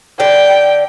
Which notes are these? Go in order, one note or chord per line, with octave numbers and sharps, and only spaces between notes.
D3 D5 G5